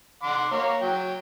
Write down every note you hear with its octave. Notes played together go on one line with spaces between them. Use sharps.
F#5 C6 D6
A#3 C#5
F#3 G5